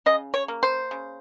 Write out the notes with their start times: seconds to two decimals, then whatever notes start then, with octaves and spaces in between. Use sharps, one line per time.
0.06 C#3 D#5
0.34 C#5
0.48 A#3
0.63 C5
0.91 C#3